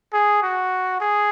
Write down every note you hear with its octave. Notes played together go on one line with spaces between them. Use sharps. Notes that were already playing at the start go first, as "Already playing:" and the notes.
G#4
F#4
G#4